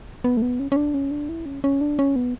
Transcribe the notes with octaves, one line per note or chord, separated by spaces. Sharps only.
B3
A3
B3
C#4
C#4
D4
C#4
D4
E4
C#4
C#4
D4
C#4
B3